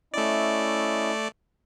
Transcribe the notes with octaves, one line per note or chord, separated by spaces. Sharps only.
A3 C#4 E4 D5 D#5